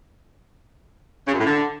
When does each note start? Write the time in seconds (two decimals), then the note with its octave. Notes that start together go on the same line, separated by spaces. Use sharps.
1.28 C#3
1.34 F#2
1.40 A2
1.46 D3